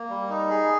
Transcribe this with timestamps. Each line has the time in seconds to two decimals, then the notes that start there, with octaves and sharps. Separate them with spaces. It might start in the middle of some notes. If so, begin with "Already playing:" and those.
Already playing: A#3
0.09 G3
0.29 D#4
0.49 G#4